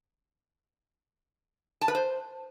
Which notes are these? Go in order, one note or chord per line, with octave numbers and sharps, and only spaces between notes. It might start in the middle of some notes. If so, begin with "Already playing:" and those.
A5
B4
C5